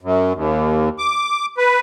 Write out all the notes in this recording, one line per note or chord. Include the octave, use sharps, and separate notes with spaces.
F#2
D#2
D6
B4